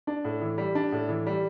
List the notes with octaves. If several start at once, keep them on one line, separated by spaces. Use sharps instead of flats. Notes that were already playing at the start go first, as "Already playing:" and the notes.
D4
A2
E3
G3
D4
A2
E3
G3